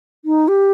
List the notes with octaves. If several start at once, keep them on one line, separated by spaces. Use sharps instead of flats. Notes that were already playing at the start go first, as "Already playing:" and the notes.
D#4
G4